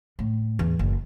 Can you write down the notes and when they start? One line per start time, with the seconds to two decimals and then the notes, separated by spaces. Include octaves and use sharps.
0.19 A2
0.59 E2
0.79 F#1